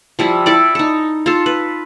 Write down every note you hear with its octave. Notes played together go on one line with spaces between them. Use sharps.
F3 G3 E4
E4 A4 D5
D#4 A4
F4 A4
B4